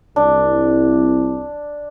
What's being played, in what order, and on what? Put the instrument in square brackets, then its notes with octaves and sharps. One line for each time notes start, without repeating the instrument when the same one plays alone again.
[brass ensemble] C2 [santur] D4